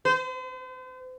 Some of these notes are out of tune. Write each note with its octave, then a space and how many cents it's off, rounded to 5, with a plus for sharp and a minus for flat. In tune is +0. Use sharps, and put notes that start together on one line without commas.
C5 -40